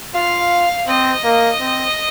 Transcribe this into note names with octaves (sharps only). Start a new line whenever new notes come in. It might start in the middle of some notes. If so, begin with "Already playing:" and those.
F4 F5
C4 D#5
A#3
C4